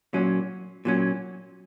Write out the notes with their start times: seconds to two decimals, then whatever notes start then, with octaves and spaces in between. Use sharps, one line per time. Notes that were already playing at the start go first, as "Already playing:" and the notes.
0.13 A#2 F#3 C#4
0.85 A#2 F#3 C#4